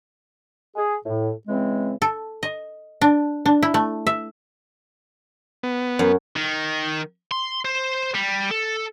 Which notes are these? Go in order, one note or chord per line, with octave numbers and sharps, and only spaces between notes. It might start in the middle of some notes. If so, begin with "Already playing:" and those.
G#4
A2
C#3 E3 G#3 C4
A4
D#5
D4
D4
E4
A3
E5
B3
F#2
D#3
C6
C5
G3
A4